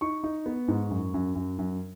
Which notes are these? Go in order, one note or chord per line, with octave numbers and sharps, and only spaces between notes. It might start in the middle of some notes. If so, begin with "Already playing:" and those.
D#4 C#6
D#4
B3
G#2
F#2
F#2
F#2
F#2